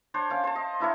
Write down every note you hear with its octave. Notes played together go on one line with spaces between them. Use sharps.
D4 C5 C#5
C#4 F5 D6
C5 A5
D#5
D4 E4 A#4 C#5